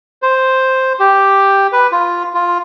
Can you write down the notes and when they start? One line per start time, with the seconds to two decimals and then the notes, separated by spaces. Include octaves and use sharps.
0.23 C5
1.00 G4
1.73 B4
1.92 F4
2.34 F4